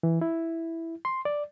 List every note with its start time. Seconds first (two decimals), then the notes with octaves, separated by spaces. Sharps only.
0.03 E3
0.21 E4
1.05 C6
1.25 D5